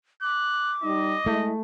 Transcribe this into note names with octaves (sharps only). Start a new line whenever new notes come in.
D6 F#6
G3 D#4 D#5
G#3 A3 E4